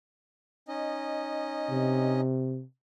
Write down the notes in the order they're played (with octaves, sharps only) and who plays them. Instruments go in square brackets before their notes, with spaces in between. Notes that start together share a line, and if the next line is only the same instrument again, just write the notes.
[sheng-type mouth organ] C#4 D#4 D#5
[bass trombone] C3